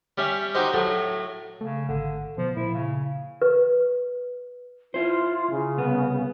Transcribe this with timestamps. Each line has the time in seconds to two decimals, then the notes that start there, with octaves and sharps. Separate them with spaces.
0.18 G3 C#4 E5
0.54 D#4 F#4 G4 C5 D#5
0.74 A2 F#3 A3
1.61 C#3 A3
1.89 G#1 D3
2.38 B2 F3
2.57 A#2 E4
2.74 C#3
3.42 B4
4.94 E4 F4 C5
5.51 C#3
5.77 C2 B3